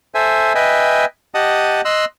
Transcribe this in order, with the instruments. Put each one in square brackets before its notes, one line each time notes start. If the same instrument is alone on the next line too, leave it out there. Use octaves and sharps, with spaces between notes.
[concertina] A4 C5 E5 G#5
B4 D#5 E5 G5 G#5
G4 D#5 F#5 A5 D#6
D#5 C6 E6 F#6